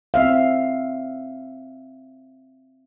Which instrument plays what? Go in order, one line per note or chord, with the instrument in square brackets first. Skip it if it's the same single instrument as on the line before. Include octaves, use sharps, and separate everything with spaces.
[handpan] C4 E5 F5